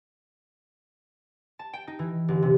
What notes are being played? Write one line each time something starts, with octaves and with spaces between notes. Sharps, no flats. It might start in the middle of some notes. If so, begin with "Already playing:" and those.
A5
G5
D#4
E3
G1
C3